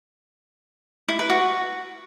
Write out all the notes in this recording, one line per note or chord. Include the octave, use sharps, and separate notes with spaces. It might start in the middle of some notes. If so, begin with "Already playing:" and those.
E4
B4
F#4